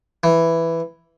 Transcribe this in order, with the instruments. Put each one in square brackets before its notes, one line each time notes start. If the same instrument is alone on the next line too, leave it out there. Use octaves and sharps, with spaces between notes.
[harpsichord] E3